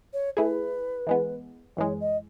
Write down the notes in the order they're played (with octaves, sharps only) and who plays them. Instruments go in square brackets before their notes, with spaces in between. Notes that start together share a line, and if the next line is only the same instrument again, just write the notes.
[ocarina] C#5
[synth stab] A3 E4 G#4 [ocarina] B4
[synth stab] E3 G#3 B3
[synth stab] F#2 E3 G#3 [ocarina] C#5
[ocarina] D#5